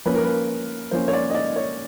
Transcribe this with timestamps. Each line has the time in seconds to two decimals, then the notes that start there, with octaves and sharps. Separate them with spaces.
0.05 F3 A#3 C#4 B4
0.15 A#4
0.24 B4
0.91 F3 A#3 C#4 C5
1.08 C#5
1.13 D5
1.30 D#5
1.34 D5
1.56 C#5